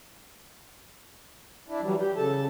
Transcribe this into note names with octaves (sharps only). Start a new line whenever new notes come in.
D4 E4
E3 F#3 G3
G4
C#3 A4 A5